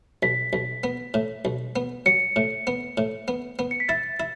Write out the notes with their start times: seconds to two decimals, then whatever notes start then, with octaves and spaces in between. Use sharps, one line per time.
0.23 B1 B6
0.53 B1
0.84 B3
1.14 A2
1.45 B1
1.76 B3
2.06 F#3 C#7
2.36 A2
2.67 B3
2.98 A2
3.28 B3
3.59 B3
3.71 C#7
3.80 B6
3.88 E4 A6
4.20 E4